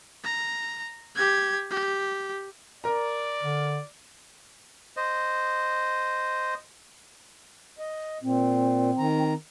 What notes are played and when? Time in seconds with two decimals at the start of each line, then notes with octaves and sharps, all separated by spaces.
0.24 A#5
1.15 G4 G#6
1.70 G4
2.84 A#4 D5 A#5
3.42 D3
4.97 C5 D#5
7.79 D#5
8.23 A#2 C4
8.98 D#3 A#5